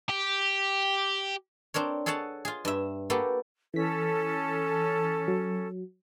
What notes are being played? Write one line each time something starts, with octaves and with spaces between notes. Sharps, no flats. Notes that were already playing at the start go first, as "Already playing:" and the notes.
G4
C4 D4 A#4 C#5
G#4 A4 C#5 F#5 A5
F4 G#4
G2 E5
A#3 B3 F#4 G4 A4
E3 C#4 A4 B6
F#3